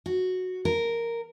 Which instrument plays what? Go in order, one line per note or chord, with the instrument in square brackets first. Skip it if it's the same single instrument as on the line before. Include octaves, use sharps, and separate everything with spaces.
[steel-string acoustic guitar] F#4
A#4